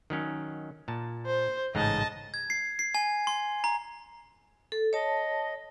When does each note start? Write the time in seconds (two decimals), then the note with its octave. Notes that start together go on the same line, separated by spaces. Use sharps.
0.10 D#3 F#3 C#4
0.88 A#2 A5
1.26 C5
1.75 A1 G#2 C#3 D#5 A5
2.34 G#6
2.50 C7
2.79 C7
2.95 G#5
3.27 C6
3.64 A#5
4.72 A4
4.93 C#5 D#5 A5